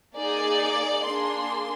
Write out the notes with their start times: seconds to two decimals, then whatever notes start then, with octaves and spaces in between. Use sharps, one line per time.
0.16 A#3 D#4 G#4 D5
1.03 A#3 D4 G#4 C6